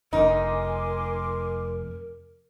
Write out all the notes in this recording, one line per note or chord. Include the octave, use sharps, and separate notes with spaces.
F1 D#4 A#4 G#5 C6 D6